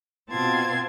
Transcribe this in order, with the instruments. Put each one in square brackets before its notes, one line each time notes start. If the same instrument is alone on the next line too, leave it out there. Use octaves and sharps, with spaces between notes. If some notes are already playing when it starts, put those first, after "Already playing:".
[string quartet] B2 C4 F4 A5 C6 G#6